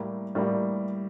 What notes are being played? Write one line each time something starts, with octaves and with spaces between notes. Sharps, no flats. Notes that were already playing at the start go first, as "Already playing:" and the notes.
Already playing: A2 G3 A#3
A2 G3 A#3